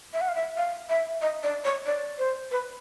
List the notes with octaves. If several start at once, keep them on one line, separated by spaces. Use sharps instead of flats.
E5
F#5
F5
E5
F5
E5
D#5
D5
C#5
D5
C5
B4